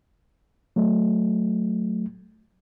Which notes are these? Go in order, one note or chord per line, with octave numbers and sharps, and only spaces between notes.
F#3 A3